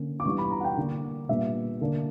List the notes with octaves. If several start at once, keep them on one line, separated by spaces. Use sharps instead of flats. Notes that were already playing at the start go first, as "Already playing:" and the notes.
Already playing: D3 A#3 C#4
D6
E3 G3 B3 D4 C#6
B5
A#5
F#5
G5
D3 A#3 D4
A#2 G3 B3 D4 E5
D3 A#3 D4